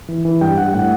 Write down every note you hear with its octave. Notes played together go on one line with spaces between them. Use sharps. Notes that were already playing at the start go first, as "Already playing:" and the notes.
E3
E3
G2 G5
G2 F#5
A2 F#5